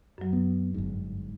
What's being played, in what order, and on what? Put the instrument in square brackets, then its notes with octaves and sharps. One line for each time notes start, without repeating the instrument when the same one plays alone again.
[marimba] F#2 F#3
[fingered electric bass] B3
G1 G#2